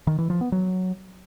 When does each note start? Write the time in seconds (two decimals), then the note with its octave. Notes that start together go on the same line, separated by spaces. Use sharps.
0.07 D#3
0.18 E3
0.30 F3
0.41 B3
0.52 F#3